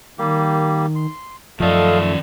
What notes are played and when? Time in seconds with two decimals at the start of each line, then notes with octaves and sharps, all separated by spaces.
0.19 D#3 G3 A#3 G4
0.95 C6
1.60 F#2 D#3 F3 A3 A4 D5 D#5 F5